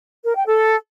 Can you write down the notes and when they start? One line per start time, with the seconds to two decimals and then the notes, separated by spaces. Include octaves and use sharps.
0.25 A#4
0.35 G5
0.46 A4